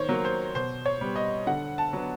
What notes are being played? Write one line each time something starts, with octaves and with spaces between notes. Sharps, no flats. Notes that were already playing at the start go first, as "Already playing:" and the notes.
Already playing: D#3 C5 C#5
F#3 A#3
C5
B2 C5
C#5
G3 B3
D#5
D3 F#5
A5
F#3 B3 D4